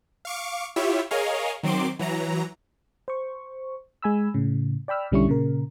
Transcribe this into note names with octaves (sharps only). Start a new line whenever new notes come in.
F5 C#6 D6
E4 F4 G4 C#5 E5
G#4 A#4 C#5 D#5 F5
D#3 F#3 C4 C6 D6
E3 F#3 A#5
C5 C#6
G#3 G#5 B5 E6
A2 C#3
D5 G5 B5 E6 F6
B1 D3 G3 C#4 E4 C#6
A#2 C#3 A#4